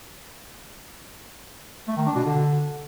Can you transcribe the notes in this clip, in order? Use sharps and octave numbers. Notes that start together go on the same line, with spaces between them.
A3
D#3
D4
B2
D3